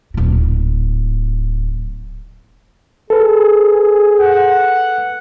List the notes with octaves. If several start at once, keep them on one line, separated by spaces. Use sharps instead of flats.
D1 A#2
G#4 A4 B4
F#5